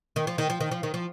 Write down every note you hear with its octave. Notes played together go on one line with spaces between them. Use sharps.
D#3
F3
D#3
F3
D#3
F3
D#3
F3